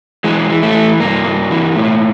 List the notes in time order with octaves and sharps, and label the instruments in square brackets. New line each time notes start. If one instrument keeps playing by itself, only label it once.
[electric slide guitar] E3 G#3
E3
A3
E3
G2 A#3
G2
E3
A2